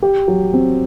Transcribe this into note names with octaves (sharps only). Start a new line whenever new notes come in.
G4
F#3
C4